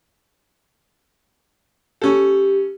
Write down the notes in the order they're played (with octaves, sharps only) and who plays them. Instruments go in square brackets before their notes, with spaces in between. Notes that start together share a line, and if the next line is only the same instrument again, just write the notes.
[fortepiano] C#4 A4 [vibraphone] G4